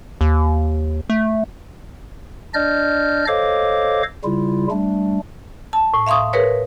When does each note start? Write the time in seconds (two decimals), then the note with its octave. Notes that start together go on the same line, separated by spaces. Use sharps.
0.21 D#2
1.10 A3
2.54 D4 D5 D#5 F6 G6
3.28 A4 C5 C#5 D#5 F5 D6
4.24 C#3 G3 E4 F4
4.71 G3 A3 D4
5.73 A5
5.94 A2
6.07 E5 F5 C6 C#6 D#6
6.33 G#4 A#4 B4 C#5